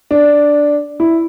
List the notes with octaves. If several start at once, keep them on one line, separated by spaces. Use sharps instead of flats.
D4
E4